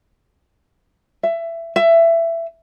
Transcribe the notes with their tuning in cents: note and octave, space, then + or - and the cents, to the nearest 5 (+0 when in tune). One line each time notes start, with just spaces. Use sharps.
E5 +20
E5 +15